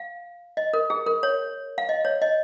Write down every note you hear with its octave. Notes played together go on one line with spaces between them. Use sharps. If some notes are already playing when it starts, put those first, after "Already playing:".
Already playing: F5
D#5
A#4
G#4
A#4
C#5
F5
D#5
C#5
D#5